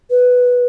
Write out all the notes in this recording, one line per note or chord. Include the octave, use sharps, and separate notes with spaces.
B4